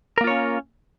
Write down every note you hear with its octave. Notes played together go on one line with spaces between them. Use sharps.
A#3 C#4 F4 A#4 C#5